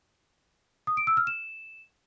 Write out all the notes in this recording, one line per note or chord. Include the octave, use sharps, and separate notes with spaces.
D#6
D7
E6
F6
E7